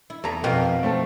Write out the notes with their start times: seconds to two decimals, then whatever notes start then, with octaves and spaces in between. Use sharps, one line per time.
0.10 E4
0.24 E2 A4 A#5
0.44 F2 B2 A#4 B4 F5 G5
0.83 A3 C4 A4